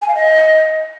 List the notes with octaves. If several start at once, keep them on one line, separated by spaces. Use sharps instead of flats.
G#5
F5
D#5